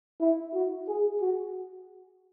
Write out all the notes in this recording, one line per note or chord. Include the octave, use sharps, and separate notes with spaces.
E4
F#4
G#4
F#4